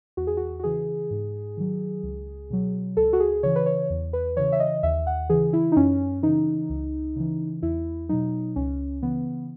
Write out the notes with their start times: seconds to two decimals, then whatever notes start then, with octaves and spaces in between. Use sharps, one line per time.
0.17 E2 F#4
0.27 G#4
0.37 F#4
0.59 F#4
0.63 C#3 E3 G#4
1.11 G#2
1.57 D#3 F#3
2.03 C#2
2.50 B2 F#3
2.97 C#2 A4
3.13 F#4
3.20 G#4
3.43 C#3 E3 C#5
3.56 B4
3.66 C#5
3.90 E2
4.13 B4
4.36 C#3 E3 C#5
4.52 E5
4.60 D#5
4.83 D#2 E5
5.07 F#5
5.30 C#3 E3 G#4
5.53 E4
5.72 D#4
5.76 F#2 C#4
6.23 C#3 E3 D#4
6.70 C#2
7.16 C#3 E3
7.62 E2 E4
8.09 B2 F#3 D#4
8.56 C#2 C#4
9.02 C#3 E3 B3